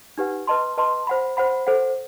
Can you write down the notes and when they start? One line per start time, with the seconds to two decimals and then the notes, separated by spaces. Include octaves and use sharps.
0.18 D#4 G4 B4 F#5
0.47 B4 D#5 A5 C6
0.77 B4 D#5 A5 C6
1.07 C5 F#5 B5
1.37 C5 F#5 B5
1.67 A4 C5 F#5